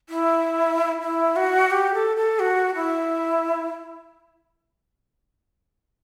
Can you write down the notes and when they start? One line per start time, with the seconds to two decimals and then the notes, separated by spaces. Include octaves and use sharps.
0.09 E4
1.02 E4
1.36 F#4
1.71 G4
1.94 A4
2.17 A4
2.39 F#4
2.75 E4